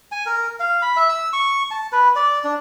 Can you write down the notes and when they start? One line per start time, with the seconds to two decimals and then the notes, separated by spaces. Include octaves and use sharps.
0.12 G#5
0.26 A#4
0.60 F5
0.82 B5
0.96 E5
1.09 E6
1.33 C#6
1.71 A5
1.92 B4
2.16 D5
2.44 D4